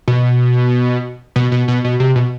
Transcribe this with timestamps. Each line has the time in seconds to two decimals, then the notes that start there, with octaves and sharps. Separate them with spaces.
0.08 B2
1.36 B2
1.52 B2
1.68 B2
1.84 B2
2.00 C3
2.16 B2